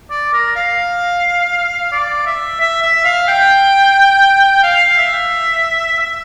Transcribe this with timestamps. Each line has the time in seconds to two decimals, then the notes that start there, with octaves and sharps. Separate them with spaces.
0.10 D5
0.33 A#4
0.56 F5
1.92 D5
2.26 E5
2.60 E5
2.82 E5
3.05 F5
3.28 G5
4.63 F5
4.98 E5
5.99 E5